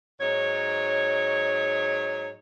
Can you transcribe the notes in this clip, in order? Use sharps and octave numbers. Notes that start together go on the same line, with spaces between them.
G#2 F#3 D#4 C#5